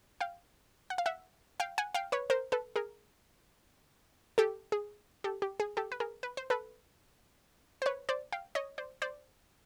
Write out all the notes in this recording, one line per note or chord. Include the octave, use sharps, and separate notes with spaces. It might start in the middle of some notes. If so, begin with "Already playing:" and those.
F5 G5
F#5
F5
E5 F#5
F5 G5
F#5 G#5
F5 G5
B4 C#5
A#4 C5
A4 B4
G#4 A#4
G4 A4
G#4
G4 A4
G4
G#4
G4 A4
B4
G#4 A#4
B4
C5
A4 B4
C5
B4 C#5
C5 D5
F5 G5
C#5 D#5
C5 D5
C5 D5